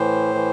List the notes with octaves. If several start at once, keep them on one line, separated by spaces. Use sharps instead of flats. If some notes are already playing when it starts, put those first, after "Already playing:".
Already playing: A2 E3 C5
E3